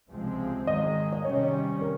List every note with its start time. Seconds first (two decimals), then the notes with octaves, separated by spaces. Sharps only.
0.10 C#2 C3 F3 G#3 C4
0.67 G#2 D#3 G#3 D#5
1.13 D#5
1.24 C3 D#3 G3 C#4 C#5
1.81 A#4